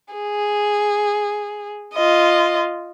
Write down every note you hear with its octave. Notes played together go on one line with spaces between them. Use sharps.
G#4
F4 D#5